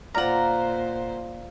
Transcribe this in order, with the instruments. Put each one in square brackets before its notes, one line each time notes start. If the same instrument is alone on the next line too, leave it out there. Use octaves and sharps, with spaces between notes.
[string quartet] A#2 C5 [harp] F4 D5 F6 [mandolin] F#5 A#5